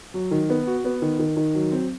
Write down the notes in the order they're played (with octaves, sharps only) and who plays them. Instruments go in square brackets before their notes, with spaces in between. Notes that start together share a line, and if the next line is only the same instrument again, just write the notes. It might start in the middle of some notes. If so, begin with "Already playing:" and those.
[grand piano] F#3
D#3
B3
F#4
B3
D#3
D#3
D#3
F#3
C4